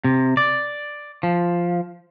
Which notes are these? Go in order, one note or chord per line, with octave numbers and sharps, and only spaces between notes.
C3
D5
F3